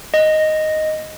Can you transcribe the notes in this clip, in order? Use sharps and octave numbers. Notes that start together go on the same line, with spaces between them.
D#5